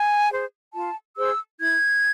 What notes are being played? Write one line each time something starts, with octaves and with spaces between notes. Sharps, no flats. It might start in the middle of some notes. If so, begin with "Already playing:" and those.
Already playing: G#5
G#4 C5
F4 A5
G#4 C5 E6
E4 G#6